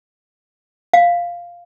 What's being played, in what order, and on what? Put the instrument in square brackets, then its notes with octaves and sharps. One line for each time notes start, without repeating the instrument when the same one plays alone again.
[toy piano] F5